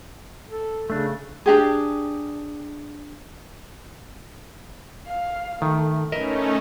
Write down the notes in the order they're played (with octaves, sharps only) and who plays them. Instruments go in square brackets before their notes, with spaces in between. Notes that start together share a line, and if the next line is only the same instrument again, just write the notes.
[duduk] A4
[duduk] C#3 [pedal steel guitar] A3 D4
[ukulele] D4 G4 G#4
[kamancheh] F5
[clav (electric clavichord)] D#3 [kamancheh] A3
[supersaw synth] A3 C#4 D#4 [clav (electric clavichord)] A#4 D#5 E5 [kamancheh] B4